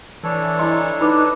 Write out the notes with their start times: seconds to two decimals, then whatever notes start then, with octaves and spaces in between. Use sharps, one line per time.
0.23 E3 D4 A4 C#5
0.59 E4 D#5 C6
1.01 D#4 B4 B5 D6